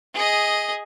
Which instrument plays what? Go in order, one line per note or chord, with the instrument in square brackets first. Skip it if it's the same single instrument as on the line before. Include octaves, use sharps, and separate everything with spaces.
[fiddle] G#4 D#5